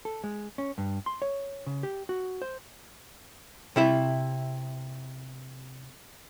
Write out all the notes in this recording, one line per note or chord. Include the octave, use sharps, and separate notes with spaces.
A4
G#3
C#4
G2
C6
C#5
C#3
G4
F#4
C5
C3 E4 E5